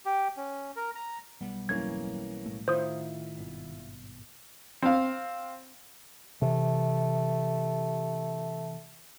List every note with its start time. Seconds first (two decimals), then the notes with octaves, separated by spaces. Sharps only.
0.05 G4
0.37 C#4
0.76 A#4
0.95 A#5
1.41 B1 G3 B3
1.69 G1 E3 F#3 A#3 C#4 G#6
2.46 A2 A3
2.68 D#3 E4 F4 C5 D#6
3.37 G#1 G2 B2
4.82 C4 F5
6.42 C3 E3 A3